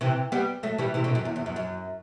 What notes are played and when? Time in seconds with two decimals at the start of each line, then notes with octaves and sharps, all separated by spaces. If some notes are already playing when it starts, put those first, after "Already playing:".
0.01 C3 E3
0.32 G3 B3
0.63 F#3 A3
0.78 E3 G3
0.94 C3 E3
1.04 B2 D3
1.15 F#2
1.25 E2
1.36 E2
1.46 F#2
1.56 F#2